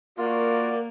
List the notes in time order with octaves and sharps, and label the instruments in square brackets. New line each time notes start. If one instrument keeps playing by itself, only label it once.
[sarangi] A#3 [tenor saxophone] F4 [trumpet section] F#4 D5 [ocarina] A#4